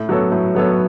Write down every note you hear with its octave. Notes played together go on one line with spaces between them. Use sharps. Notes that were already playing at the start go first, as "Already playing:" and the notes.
Already playing: A2
F#3 B3 A4 C#5
A2
F#3 B3 A4 C#5